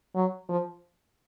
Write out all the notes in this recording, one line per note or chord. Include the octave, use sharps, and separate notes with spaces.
F#3
F3